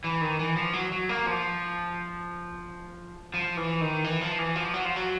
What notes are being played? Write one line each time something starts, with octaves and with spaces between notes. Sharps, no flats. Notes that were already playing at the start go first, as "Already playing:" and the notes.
E3
D#3
E3
F3
F#3
F#3
A#3
F3
F3
E3
D#3
E3
F3
E3
F3
F#3
F3
F#3